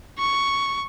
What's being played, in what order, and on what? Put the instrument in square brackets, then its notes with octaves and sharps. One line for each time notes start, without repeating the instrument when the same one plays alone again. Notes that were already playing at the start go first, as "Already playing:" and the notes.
[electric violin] C#6